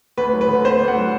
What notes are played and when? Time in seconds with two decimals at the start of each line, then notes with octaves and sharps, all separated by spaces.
0.17 D2 B4
0.33 F#3
0.41 B4
0.48 D3
0.65 D2 C5
0.80 D2
0.88 F#5
0.96 F#3